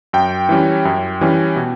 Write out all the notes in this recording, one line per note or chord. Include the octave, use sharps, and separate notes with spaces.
F#2 G5
E3 G3 C#4
F#2
E3 G3 C#4
B2